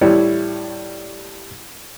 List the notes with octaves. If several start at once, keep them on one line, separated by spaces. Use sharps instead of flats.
A2 G3 E4 C#5